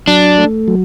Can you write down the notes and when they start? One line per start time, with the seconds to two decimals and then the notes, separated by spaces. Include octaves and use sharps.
0.08 F#3 D4
0.38 A3
0.68 F#3